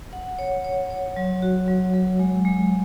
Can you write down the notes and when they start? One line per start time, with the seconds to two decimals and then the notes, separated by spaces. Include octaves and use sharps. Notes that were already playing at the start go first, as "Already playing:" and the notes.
0.13 F#5
0.39 C#5
0.65 C#5
0.91 C#5
1.16 F#3
1.42 F#4
1.68 F#3
1.94 F#3
2.19 G#3
2.45 G#3